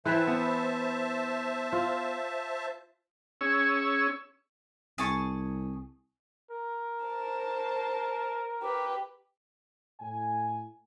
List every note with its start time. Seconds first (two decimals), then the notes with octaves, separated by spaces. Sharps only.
0.05 E3 B4 C5 E5 G5 A5
0.27 B3
1.72 F4
3.41 C#4 G#4 C#5 E6
4.98 C2 G#4 A5 C#6
6.51 A#4
7.05 C5 A5
8.62 G4 B4
10.00 A2 G#5